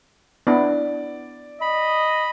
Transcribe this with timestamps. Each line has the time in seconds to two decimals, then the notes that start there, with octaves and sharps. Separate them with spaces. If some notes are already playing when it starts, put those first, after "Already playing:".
0.47 B3 D4 E4 D5
1.61 D#5 B5